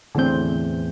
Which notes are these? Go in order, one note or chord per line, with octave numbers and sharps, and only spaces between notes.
E2 A2 D3 C4 G6